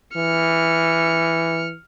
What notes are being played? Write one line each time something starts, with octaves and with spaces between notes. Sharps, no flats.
E3 F6 C#7